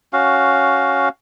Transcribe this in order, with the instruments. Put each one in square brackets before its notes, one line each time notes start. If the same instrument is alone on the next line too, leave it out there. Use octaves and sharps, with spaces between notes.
[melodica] C#4 F#4 F5